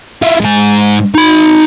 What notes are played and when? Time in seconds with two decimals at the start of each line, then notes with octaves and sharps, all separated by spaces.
0.22 E4 F4
0.41 G#2 G#5
1.15 D#4 B5